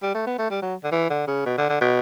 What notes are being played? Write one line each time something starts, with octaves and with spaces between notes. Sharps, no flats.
G3
A3
B3
A3
G3
F#3
D3
E3
D3
C#3
B2
D3
D3
B2